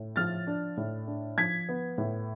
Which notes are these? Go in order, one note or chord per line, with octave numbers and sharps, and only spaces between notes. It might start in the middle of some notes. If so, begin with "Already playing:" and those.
Already playing: A2
F3 F6 A6
D4
A2
D4
F3 G#6 B6
B3
A2